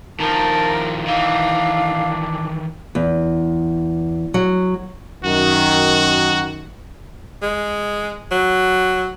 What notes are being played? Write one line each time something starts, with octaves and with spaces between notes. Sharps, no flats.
D#3 F3 A#4 A5
D#3 E3 D4 F5
E2
F#3
F#2 D#3 F#4
G#3
F#3